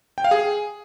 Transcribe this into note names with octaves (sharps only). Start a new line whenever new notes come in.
G5
F5
G#4